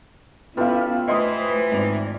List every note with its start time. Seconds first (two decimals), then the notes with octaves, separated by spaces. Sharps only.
0.57 G3 B3 C#4 E4 F4 A4 B4 F5
1.08 E3 A3 B4 C5 D#5 C6 D#6
1.72 G#1 D5 A#5